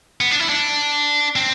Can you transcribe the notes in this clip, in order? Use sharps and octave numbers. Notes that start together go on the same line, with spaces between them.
B3
D4
E4
D4
C4